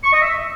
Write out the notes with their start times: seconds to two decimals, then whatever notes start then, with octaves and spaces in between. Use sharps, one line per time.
0.04 C#6
0.13 D#5
0.22 E5